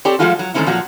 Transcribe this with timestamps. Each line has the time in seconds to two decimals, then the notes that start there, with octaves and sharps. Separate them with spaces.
0.05 C4 G4 A4 C#5 D5
0.19 F3 F#3 G#3 A3 F4 F#4
0.39 F#3
0.54 D#3 G#3 A3 C4 C#4 E4
0.66 A#2 F3 F#3 F#4